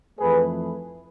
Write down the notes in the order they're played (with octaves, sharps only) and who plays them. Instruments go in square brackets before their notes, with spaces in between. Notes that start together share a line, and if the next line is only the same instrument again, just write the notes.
[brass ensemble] F2 E3 A3 G#4 B4